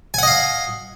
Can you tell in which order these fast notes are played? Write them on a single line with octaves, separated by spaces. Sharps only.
G#5 F#5 D#5 F5